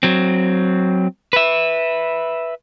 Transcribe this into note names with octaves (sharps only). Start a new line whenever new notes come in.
F#3 C4
B4 E5